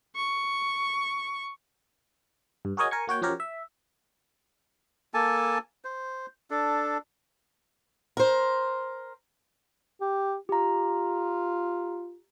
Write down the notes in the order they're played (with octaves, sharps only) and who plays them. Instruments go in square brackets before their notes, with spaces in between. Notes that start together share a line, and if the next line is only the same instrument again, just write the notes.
[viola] C#6
[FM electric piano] G2
F#4 G#4 A#4 C#5 D#5 G#5
A#4 G#5 C#6
A#3 F#4 C#5 G5
F3 C#4 F#4 G4 A#4 C#5
E5
[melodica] A#3 A4 G#5 A5
C5
D4 A4
[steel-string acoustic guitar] A#4 C5
[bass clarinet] G4
[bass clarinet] F4 [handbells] G4 A#5